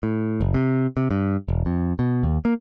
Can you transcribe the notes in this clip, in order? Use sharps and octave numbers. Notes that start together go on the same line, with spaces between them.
A2
F#1
C3
C3
G2
E1
F2
B2
D#2
A#3